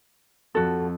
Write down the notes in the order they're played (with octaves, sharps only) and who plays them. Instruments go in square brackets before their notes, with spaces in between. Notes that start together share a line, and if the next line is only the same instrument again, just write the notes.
[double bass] F2 [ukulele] F#4 A4